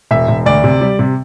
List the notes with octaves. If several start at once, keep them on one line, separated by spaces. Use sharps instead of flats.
E1 E5
E1
D2 D5
C3
G3
C3